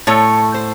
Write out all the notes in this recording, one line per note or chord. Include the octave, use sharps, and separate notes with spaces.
A2 A3 C#5
C5